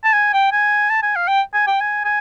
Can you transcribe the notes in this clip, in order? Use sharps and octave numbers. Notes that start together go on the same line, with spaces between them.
A5
G#5
G5
G#5
A5
G#5
F5
G5
G#5
G5
G#5
G#5